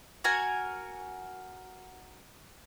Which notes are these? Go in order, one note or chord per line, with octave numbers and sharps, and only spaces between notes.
F#4 A#4 F#5 G#5